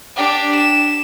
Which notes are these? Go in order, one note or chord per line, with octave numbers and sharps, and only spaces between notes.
D4 G4
E7